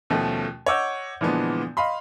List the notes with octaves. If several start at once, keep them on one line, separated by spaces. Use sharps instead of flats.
D#2 B2 F3 A3 C#4
C#5 D#5 F#5 D6 E6 G6
A#2 D3 E3 F3 G#3 B3
D#5 F5 B5 C6